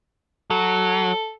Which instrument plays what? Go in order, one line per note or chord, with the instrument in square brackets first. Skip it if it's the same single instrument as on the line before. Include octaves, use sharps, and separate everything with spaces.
[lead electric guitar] F#3 [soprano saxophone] A4